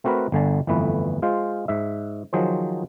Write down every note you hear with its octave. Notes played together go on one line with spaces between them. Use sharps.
A3 C4 F#4 A#4 B4
G1 D3 G#5 A5
G1 F2 E3 A3 B4
G#3 F4 C5
G#2 E5
D#3 F3 F#3 G#4 C5